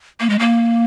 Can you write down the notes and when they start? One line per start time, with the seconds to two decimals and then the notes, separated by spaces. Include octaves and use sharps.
0.20 A#3
0.30 G#3
0.39 A#3